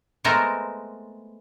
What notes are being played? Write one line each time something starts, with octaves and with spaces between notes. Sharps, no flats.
G#3 A3 B3 C4 A4 A#4